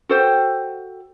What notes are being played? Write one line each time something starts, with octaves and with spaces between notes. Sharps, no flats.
F#4 A4 C5 G5